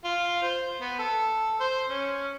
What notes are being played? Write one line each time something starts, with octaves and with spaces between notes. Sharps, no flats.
F4
C5
B3
A4
C5
C#4